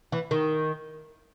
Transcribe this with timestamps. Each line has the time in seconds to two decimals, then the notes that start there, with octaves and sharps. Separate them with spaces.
0.12 E3
0.31 D#3